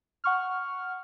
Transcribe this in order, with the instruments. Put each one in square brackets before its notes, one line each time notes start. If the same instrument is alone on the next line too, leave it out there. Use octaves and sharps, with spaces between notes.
[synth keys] F#5 C#6 F6